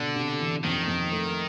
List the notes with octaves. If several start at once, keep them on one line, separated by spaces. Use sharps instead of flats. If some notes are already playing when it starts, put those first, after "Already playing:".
Already playing: B2 D3
C3
E3
F2 D#3
F2
A3